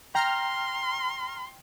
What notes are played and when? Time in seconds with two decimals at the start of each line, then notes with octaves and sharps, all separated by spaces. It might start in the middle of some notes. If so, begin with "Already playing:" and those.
0.15 G5 A#5 C6 F6